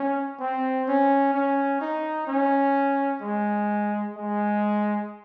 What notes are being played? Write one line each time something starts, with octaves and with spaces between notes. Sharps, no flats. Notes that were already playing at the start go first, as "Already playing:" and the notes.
Already playing: C#4
C4
C#4
C#4
D#4
C#4
G#3
G#3